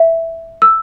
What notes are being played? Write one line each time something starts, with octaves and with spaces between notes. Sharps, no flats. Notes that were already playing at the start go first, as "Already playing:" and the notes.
Already playing: E5
E6